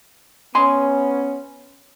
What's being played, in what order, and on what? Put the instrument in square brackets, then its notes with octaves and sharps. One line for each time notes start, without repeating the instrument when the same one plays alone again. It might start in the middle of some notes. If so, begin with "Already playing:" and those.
[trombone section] B3 C#4 [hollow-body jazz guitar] G#5 C6